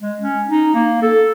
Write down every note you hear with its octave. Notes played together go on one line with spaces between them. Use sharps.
G#3
C#4
D#4
A#3
A4